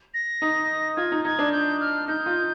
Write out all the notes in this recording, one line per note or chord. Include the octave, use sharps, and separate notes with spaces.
A#6
D#4
F4 G#6
D#4
D#4 G#6
D4
G6
F6
D#4 G6
F4